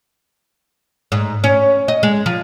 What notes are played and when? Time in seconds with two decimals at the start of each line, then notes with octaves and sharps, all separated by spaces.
1.12 G#2
1.44 C#4
1.88 D#5
2.03 G#3
2.26 F3